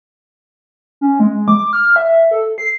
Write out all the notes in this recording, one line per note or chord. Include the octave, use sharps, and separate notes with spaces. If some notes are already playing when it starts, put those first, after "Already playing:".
C#4
G#3
D6
F6
E5
A4
C7